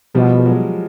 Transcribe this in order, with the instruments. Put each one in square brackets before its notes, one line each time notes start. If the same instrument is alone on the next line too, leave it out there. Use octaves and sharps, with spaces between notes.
[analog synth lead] B2 [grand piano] F3 G3
[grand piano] G3
F#3 G#3